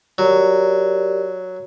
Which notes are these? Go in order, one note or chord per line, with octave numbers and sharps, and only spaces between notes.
F#3 G4 A#4 D5